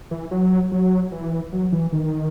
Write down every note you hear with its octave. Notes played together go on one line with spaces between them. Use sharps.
E3
F#3
F#3
E3
F#3
E3
D#3